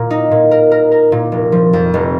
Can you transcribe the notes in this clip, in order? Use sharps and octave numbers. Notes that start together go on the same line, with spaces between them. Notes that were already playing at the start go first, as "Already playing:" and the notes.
Already playing: A#2 A#4
D#4
A#2
A#4
A#4
A#4
A#2
F1
F3
F2
F1